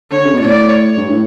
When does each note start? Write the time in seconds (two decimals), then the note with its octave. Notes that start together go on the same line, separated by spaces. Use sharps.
0.11 D3 C#5
0.26 C#3
0.34 B2
0.39 A2 D5
0.69 C#5
0.97 G2
1.09 A2